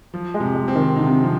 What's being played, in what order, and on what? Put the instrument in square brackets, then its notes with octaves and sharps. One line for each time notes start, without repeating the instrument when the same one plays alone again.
[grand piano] F3
[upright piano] G#3
[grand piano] C3
[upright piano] G#3
[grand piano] C4
[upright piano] D#3
[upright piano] D3 [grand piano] D#4
[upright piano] C3
[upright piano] C3 [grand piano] F3